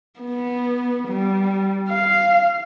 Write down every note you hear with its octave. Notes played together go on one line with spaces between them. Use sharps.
B3
G3
F5